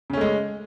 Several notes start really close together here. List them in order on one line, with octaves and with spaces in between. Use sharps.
C#3 C#4 A3 G#3